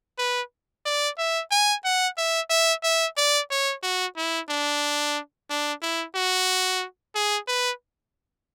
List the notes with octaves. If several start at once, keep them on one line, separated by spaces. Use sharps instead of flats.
B4
D5
E5
G#5
F#5
E5
E5
E5
D5
C#5
F#4
E4
D4
D4
E4
F#4
G#4
B4